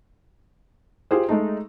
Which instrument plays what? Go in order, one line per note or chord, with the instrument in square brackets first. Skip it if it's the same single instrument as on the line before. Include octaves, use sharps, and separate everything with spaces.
[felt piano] F4 G4 G#4 C5
G#3 A3 D#4